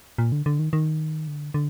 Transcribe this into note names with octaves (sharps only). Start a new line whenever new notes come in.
A#2
D3
D3
D#3
D#3
D3
D3